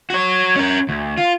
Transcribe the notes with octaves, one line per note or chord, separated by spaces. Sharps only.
F#4 C#5
C#4 A#4
D2
F4